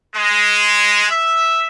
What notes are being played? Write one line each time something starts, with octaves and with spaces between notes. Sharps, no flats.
G#3
E5